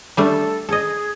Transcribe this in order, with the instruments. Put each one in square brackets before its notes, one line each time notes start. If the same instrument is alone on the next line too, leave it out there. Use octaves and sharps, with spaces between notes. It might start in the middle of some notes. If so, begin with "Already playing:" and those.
[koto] G3 A3 D4 [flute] A4
[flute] G#4 [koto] A4 D#5